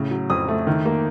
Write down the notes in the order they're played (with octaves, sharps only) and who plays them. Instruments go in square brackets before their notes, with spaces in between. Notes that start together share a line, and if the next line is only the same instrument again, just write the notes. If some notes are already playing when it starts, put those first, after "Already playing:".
Already playing: [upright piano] A2 C#3
F#3
F2 D#6
A3
D#3
A#3